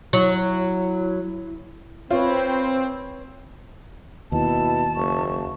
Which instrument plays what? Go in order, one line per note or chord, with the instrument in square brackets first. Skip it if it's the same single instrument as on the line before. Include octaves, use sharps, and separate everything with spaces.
[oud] F#3 [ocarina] E4
[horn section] C4 [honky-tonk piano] F4 [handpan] B4 C#5
[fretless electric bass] D#2 [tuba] B2 [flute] E4 [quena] A5
[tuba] F#1 [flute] C#6